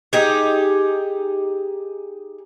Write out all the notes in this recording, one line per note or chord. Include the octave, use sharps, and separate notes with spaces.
D#4 G4 G#4